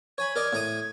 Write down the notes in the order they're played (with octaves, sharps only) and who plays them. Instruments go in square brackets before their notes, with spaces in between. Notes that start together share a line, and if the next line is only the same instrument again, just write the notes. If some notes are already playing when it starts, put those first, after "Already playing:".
[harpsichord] C#5 G#5 B5 [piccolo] G#6
[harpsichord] A#4 D5 D#5
A2 A#5 D#6